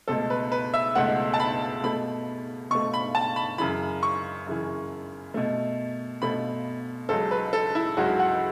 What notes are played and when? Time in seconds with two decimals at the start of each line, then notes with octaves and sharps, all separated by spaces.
0.08 C#2 B2 A3 A4
0.30 B4
0.52 B4
0.74 E5
0.95 C#2 B2 A3 F#5
1.34 A5
1.40 B5
1.83 B2 A3 B5
2.70 B2 A3 C#6
2.94 B5
3.15 A5
3.36 B5
3.58 F#2 C#3 E3 B5
4.03 C#6
4.47 F#2 C#3 E3
5.34 B2 A3
6.22 B2 A3 B5
7.09 C#2 C#3 F#3 A4
7.31 B4
7.53 A4
7.75 E4
7.97 C#2 C#3 F#3 F#4
8.19 F#5